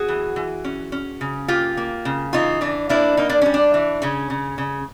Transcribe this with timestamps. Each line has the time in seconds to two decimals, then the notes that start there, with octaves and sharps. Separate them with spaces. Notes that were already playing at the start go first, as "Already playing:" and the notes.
Already playing: B3 F#4 G#4
0.08 E3
0.36 E3
0.64 C#4
0.92 C#4
1.21 C#3
1.48 A#3 F4 G4
1.77 A#3
2.05 C#3
2.33 E3 D#4 F4
2.61 E3 D4
2.89 A#3 D4 E4
3.17 A#3 D#4
3.29 D4
3.41 G3 C#4
3.54 D4
3.74 E3
4.02 C#3 C#4
4.30 C#3
4.58 C#3